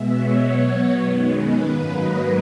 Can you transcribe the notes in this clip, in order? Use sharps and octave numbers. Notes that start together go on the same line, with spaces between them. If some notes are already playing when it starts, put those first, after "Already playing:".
Already playing: B2 G#3 B3 E5
C#5
B2 F#3 B3
F#2 D#3 G#3 B3
B4
G#2 F#3 A#3
D#5